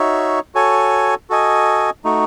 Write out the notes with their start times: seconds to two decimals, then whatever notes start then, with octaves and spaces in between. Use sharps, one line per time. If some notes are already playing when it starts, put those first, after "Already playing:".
Already playing: D#4 F#4 C#5 E5
0.55 F#4 A4 C#5 G#5
1.30 F#4 A4 D#5 G#5
2.04 A3 D#4 F#4